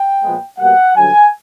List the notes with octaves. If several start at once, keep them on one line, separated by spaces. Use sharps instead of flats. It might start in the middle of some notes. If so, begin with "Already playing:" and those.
Already playing: G5
A#2 F3 G#3 B3
B2 G3 A#3 F#5
G2 D3 F#3 G#5